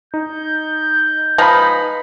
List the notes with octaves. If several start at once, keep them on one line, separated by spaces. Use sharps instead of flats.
D#4 G6
F3 G#3 D#4 B4 B5